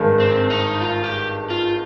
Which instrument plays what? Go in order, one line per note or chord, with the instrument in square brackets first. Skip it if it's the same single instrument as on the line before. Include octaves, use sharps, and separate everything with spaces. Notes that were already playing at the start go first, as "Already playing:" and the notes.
Already playing: [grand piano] G#1 G2 D#3 G#3
[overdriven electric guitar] C4
D#4
F4
G4
F4